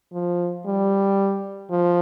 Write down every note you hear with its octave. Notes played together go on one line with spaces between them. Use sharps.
F3
G3
F3